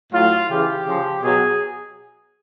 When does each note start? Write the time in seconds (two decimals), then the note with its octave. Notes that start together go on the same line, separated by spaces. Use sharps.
0.12 A2 F#3 F4
0.49 C#3 E3 G4
0.86 C#3 F3
1.22 B2 F#3 G#4